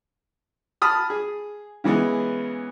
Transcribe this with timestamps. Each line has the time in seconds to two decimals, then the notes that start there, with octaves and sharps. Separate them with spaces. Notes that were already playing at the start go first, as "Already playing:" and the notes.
0.82 A5 B5 D#6 F6
1.10 G#4
1.84 C#3 E3 G#3 B3